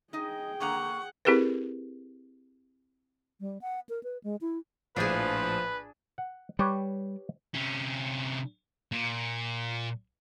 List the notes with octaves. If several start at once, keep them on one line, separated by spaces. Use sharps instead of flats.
D#4 G#4 D#5 G5
D3 A#3 F#5 A#5 C#6
C4 E4 G4 G#4 A#4 B4
G3
F#5
A#4
B4
G#3
E4
A#1 A2 F3 D4 G#4 B4
F#5
G3 G4 B4 C#5
C3 C#4
A#2